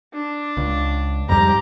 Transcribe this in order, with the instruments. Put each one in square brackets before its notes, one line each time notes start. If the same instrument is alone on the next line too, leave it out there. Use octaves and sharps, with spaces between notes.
[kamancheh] D4
[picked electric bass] C#2
[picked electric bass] F2 G#2 G3 [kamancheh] G4 A#5